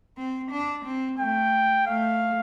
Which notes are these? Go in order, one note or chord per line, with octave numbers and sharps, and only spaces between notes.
C4
D4
C4
A3 G5
A3 F5